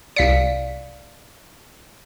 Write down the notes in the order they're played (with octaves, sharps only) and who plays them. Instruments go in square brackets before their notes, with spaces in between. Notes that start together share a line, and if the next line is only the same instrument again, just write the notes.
[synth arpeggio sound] C2 B6 C#7 [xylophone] D5 F5